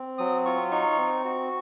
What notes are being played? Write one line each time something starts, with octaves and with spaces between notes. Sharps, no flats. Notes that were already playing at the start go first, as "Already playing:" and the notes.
Already playing: C4
F#3 D#6
F4 C#6
D#4 C#6
C4
F#4